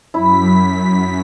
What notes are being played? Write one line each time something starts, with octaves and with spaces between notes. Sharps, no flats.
F#2 E4 B6